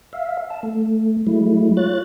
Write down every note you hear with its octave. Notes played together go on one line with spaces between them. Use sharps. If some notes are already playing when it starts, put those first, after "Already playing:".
E5 F5
A5
A3
F#3 G#3 A3 E4
F4 C#5 F#6 A6